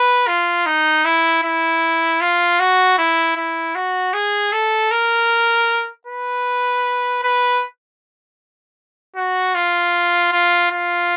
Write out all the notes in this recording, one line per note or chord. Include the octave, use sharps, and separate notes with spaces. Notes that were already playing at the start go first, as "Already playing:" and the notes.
Already playing: B4
F4
D#4
E4
E4
F4
F#4
E4
E4
F#4
G#4
A4
A#4
B4
B4
F#4
F4
F4
F4